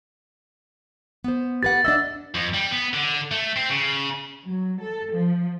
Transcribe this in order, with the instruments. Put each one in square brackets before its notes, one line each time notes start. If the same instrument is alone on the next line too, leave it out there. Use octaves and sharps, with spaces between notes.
[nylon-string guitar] B3 C5
[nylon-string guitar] G4 B4 F#5 [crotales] A6
[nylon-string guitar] D4 D#5 E5 [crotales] E6 A6
[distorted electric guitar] F2
G3
B3
D3
A3
C4
C#3
[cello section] F#3
A4
F3